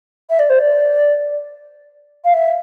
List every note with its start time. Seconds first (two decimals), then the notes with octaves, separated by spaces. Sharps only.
0.30 E5
0.39 D5
0.49 C5
0.59 D5
2.24 F5
2.33 E5